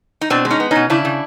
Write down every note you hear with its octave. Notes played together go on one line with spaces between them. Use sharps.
D#4
B2 C4 D4
G#3
C#4 D#4
B3
B2 C#4 D#4
C#3 D4 E4
C#3